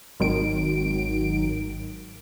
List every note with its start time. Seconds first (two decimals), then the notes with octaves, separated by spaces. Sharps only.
0.20 G#1 D#3 F#3 D7